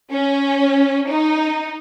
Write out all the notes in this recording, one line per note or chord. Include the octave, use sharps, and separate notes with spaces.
C#4
D#4